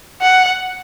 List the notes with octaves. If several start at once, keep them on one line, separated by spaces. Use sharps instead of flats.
F#5